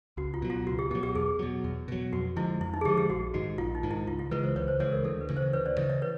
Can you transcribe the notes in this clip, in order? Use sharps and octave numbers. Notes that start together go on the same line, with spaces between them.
C#2 F#4
F4
B2 F#3
F4
C#2 F#4
G4
B2 F#3 G4
G4
E2 G#4
B2 F#3
E2
B2 F#3
F2 F#4
D3 F3 G#3 E4
F2 E4
D#4
G#4
D3 F3 G#3 G4
G4
A#1 F#4
G#2 D#3 F#4
A#1 F4
D#4
G#2 D#3
E4
C#2 F4
F4
C#3 E3 G#3 B4
C5
C#2 B4 C#5
C5
C#3 E3 G#3 B4 C#5
A#4
D2 A4
B4
C#3 E3
C5
D2 B4 C#5
C5 D5
C#3 E3 C#5 D#5
C#5 D#5
B4 C#5